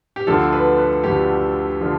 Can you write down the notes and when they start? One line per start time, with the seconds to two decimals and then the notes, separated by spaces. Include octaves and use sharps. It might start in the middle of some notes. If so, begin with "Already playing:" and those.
0.16 G4
0.27 D2 D3 F3 A4
0.53 B4
0.78 B4
1.03 D2 D3 F3 G4
1.81 D3 F3